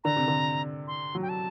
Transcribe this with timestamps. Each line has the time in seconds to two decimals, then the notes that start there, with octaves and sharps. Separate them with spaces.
0.04 D3 A#5
0.16 C3
0.28 D3
0.87 C6
1.15 F#3
1.22 G5
1.29 A5